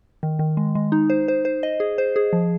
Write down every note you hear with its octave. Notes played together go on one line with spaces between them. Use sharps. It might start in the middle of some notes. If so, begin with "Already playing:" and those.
D#3
D#3
G#3
G#3
D#4
C5
C5
C5
D#5
G#4
C5
G#4
F3